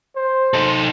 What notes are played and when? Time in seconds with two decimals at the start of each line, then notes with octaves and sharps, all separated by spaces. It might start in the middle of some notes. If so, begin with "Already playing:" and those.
0.16 C5
0.54 D#4 A4